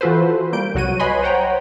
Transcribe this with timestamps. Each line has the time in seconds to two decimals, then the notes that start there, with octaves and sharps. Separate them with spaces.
0.01 E3 F4 F#4 A4 B4 C5
0.53 G3 A#3 G6 D7
0.75 C2 F#3 F#4 C#5 D#7
1.00 B4 C#5 D#5 G#5 B5 C6
1.23 C5 C#5 F#5 G5 A#5